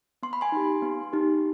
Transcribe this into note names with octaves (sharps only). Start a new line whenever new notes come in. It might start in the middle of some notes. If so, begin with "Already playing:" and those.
B3 C6
B5
G#5 C6
D#4 G4
B3
D#4 G4